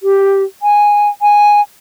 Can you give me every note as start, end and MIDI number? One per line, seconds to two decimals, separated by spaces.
0.02 0.42 67
0.62 1.08 80
1.21 1.60 80